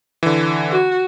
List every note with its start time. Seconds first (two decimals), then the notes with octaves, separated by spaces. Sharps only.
0.23 D3 E3
0.71 F#4